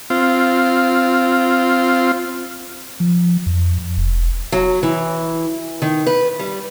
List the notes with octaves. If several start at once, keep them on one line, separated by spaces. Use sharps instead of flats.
C4 F4
F3
F2
E1
F#3
E3
D#3
B4
G3